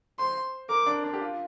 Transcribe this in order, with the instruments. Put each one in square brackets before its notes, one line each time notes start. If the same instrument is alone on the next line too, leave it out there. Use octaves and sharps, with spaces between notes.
[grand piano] C5 [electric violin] C6
[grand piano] A#4 [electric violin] D6
[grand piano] D4
D4
G4
F4